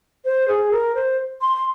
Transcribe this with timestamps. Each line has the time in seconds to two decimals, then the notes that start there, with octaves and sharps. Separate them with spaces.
0.25 C5
0.48 G#4
0.71 A#4
0.95 C5
1.41 C6